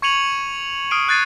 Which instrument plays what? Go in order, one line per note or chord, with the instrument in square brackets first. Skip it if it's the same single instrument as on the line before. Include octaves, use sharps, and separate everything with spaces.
[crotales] C#6 G#6 C#7 D#7 F7 F#7
D#6 F6 C7 D7 D#7
D#6 F#6 G#6 A6 C7 D#7